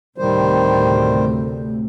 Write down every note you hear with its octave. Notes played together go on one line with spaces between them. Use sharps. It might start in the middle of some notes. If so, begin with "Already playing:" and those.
D2 A2 C3 D#3 G3 C5